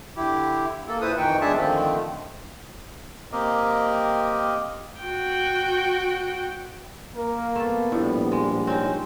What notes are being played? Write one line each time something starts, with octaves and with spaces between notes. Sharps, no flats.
D3 E4 G4
A#3 A4
A#2 E4 B4 C5 D#6
F2 D#3 E3 D#4 G5 C#6
E2 G#3 D4 G#4 E5 A5
D3 D#3 F3 A3 C4
A#3 C4 G4 A#4 D#5
F#4 G5
A#3 A#4
A3 B3 A4
A#1 A2 G3
G#3
C4 C#4 D#4